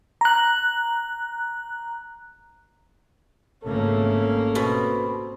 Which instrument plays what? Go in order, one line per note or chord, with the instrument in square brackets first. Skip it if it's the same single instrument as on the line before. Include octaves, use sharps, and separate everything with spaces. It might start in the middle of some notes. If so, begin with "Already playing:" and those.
[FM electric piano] A#5 F#6
[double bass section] G#1 C#3 A3 [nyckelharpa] A#3 C#4 [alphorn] A4
[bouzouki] B2 [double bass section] C4